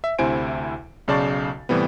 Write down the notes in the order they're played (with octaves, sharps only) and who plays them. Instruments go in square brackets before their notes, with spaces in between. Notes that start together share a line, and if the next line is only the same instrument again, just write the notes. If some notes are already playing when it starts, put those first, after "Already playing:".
[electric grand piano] E5
D2 C3 E4 C5 G#5 D7
B1 C#3 D5 A5 C#6 A6
A2 C3 E3 G3 B3